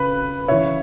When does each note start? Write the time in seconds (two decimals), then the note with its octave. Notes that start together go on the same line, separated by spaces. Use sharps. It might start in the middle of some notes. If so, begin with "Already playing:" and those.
Already playing: C#3 B4
0.48 C#3 E3 C#5 E5